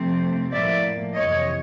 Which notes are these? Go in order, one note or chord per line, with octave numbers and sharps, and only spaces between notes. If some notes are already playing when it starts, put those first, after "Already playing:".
Already playing: C3 F3 A3 C4
A2 F3 A#3 D5 E5
F2 C3 E3 C#5 D#5